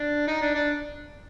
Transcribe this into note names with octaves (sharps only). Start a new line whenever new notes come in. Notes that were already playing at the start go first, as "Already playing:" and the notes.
Already playing: D4
D#4
D4
D4